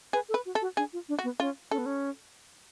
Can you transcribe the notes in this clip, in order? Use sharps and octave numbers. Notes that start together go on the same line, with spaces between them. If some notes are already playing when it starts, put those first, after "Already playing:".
G#4 B4
A4
B4
F#4
A4
F#4
D4 G#4
F4
D4
F#4
B3
C#4 F4
C#4 A4
B3
C#4